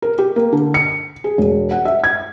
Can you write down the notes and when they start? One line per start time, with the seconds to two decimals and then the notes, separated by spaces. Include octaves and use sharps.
0.02 A#4
0.19 G4
0.36 A#3
0.53 D3
0.74 C#7
1.24 G#4
1.38 E1
1.71 F#5
1.85 E5
2.04 G#6